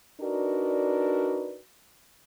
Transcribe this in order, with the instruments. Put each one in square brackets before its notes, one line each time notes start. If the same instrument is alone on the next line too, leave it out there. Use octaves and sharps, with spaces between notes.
[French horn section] D4 D#4 F#4 A#4 B4 D5